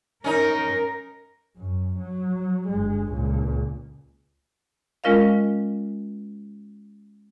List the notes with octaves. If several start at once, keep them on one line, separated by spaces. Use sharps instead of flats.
C#4 D#4 A#4
F#2
F#3
G1 G#3
C#2 A#2
G#3 C#4 F4 A#4 D#5 F5